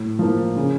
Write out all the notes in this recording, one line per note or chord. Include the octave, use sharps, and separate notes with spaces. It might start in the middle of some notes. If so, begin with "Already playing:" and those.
Already playing: A2
F3 A#3
C#3